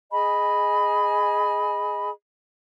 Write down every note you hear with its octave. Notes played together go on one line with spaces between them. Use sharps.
G#4 D#5 G#5 B5